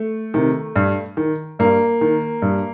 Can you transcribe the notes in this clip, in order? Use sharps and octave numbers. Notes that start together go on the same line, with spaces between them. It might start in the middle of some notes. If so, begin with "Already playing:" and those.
Already playing: A3
C3 D#3
G2
D#3
G2 A#3
D#3
G2